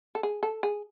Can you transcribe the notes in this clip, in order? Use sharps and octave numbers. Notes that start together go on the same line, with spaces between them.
A4
G#4
A4
G#4